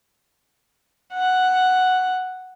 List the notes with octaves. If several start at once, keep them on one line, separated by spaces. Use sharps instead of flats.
F#5